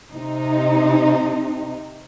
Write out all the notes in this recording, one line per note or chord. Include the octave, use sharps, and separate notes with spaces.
C3 D#4